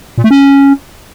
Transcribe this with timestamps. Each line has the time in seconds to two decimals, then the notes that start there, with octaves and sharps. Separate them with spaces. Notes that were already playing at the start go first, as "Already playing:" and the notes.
0.18 A#2
0.24 A3
0.31 C#4